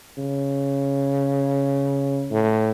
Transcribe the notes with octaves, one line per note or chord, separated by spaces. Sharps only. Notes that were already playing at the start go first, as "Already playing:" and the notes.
C#3
A2